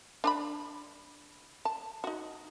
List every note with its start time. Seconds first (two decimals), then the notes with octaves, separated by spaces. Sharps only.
0.24 D4 A5 B5
1.65 A5
2.04 D#4 F#4